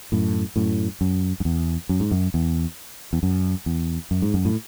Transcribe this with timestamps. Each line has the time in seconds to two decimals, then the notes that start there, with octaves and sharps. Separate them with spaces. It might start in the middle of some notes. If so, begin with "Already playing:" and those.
0.12 F#2 A2
0.56 F#2 A2
1.01 F#2
1.40 F#2
1.45 E2
1.89 F#2
2.00 G#2
2.11 F#2
2.34 E2
3.13 E2
3.23 F#2
3.66 E2
4.11 F#2
4.22 G#2
4.34 F#2
4.45 A2